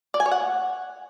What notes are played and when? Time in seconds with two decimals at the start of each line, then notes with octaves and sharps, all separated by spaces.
0.14 D5
0.20 G#5
0.26 C#5
0.31 F#5